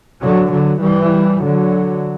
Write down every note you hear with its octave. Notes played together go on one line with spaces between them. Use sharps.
D3 F#3
D3 F#3
E3 G3
D3 F#3